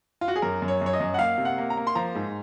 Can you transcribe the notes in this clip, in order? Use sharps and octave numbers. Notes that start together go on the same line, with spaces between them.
F4
F#4
G#4
F#2 A#4
F#2
C#5
F#2 C#5
D#5
F#2
F#5
A#3 F5
C3
F#5
A#3
A#5
A#3
C6
F3 A#5
G#2